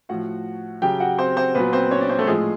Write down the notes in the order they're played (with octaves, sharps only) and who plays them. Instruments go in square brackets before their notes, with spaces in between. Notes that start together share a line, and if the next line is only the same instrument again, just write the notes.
[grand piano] A2 F3 F#4 F#5
C#3 F#3 G4 G5
F#4 F#5
C4 C5
C4 C5
A#2 F#3 B3 B4
C4 C5
C#4 C#5
D4 D5
C4 C5
A3 A4
A2 F3 G#3 G#4